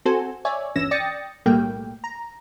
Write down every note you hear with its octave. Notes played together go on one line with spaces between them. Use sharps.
C4 F#4 A4 C5 G#5
C#5 D5 E5 G#5
G1 E2 C#4 E6 A#6 E7
D5 G5 D#6 A6 A#6 C#7
B1 A2 G3 A3 A#3 G5
A#5